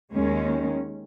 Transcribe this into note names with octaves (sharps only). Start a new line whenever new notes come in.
D#2 D#3 G#3 C#4